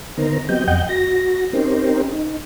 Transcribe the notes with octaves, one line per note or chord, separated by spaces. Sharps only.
D3 B3 D#4 A#4 C5 A#5
F#3 B3 C4 G4 D#5 G6
F2 D#5 F#5 G5 G6
F#4 A#6
C4 C#4 D#4 G4 A#4 C5
D#4